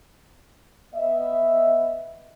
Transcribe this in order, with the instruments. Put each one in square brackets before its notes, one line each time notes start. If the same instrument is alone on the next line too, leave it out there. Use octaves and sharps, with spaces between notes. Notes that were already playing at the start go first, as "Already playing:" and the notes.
[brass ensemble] B3 D#5 E5